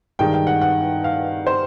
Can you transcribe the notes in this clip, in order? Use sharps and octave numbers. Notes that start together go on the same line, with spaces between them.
G2 D#3 G#3 G5
G5
F#5
F#5
F5
C5